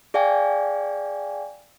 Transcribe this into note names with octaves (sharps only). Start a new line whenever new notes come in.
G#4 D5 F5 G5 G#5